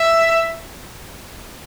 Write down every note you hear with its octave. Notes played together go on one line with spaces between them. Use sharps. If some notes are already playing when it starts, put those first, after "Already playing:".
Already playing: E5